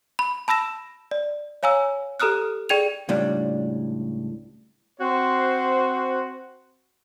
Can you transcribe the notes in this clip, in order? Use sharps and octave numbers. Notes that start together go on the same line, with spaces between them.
B5
A5 B5 E6 A#6 E7
D5
C#5 F5 G#5 A#5 E6
G4 A4 A#5 D#6 F6 F#6
G#4 D5 G5 G#6 D#7 F7
C#2 A2 G3 D4
C4 F#4 C5